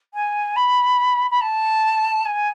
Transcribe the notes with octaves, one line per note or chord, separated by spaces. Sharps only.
G#5
B5
B5
A5
G#5